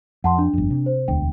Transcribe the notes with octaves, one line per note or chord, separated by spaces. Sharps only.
F2 F#5 A5 C6
D4
G1 F2
C3
C5
E1 D2 G5